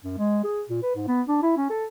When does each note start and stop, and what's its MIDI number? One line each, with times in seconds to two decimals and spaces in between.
0.04 0.15 42
0.18 0.44 56
0.44 0.62 68
0.69 0.79 46
0.83 0.94 71
0.96 1.05 44
1.08 1.22 59
1.28 1.38 62
1.43 1.54 64
1.57 1.67 61
1.70 1.85 69